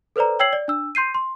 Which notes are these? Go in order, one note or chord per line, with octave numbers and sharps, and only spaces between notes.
A4 B4 C5 D5 A#5
C#5 G5 E6 G#6 C7 F#7
D5
D4 E6
C6 G6 C7 D#7
C6